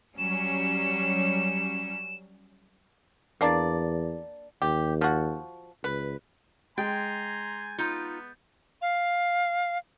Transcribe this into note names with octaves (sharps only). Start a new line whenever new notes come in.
F#3 G3 C#4 E7
E2 A#3 D4 D5
D#2 G4
F3 F#4
C#2 B4
G#3 G5 G#5 A#5 C6 G6 A6
B3 D#4 F4
F5